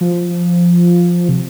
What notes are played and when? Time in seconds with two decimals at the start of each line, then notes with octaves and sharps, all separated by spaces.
0.01 F3
1.29 C3